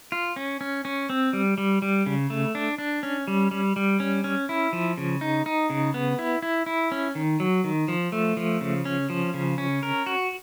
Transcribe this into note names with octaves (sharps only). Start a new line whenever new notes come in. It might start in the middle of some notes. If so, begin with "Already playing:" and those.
F4
C#4
C#4
C#4
C4
G3
G3
G3
C#3
A3
D4
D4
C#4
G3
G3
G3
C#4
C#4
E4
F3
C#3
D#4
D#4
C#3
B3
E4
E4
E4
C#4
D#3
F#3
D#3
F3
A3
F3
C#3
C#4
F3
C#3
C#4
A#4
F#4